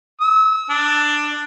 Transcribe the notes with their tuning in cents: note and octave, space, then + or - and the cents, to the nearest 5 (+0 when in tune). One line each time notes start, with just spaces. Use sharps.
E6 -35
D4 +10